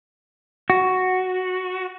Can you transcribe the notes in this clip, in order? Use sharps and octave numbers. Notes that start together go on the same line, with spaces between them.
F#4